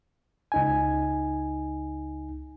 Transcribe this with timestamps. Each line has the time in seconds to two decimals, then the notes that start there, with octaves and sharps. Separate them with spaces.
0.52 C#2 D#4 G#5